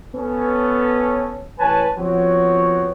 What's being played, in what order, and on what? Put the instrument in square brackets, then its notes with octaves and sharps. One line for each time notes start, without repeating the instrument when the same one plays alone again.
[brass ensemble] B3 C#4 A4
A1 B4 C#5 G#5 A5
F3 B3 C4 F#4 C#5